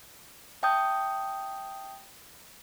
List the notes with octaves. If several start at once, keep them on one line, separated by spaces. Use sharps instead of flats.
E5 G5 A5 D#6 G6